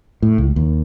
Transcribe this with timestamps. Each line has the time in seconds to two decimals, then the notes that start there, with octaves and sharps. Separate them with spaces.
0.22 A2
0.38 C#2
0.56 D#2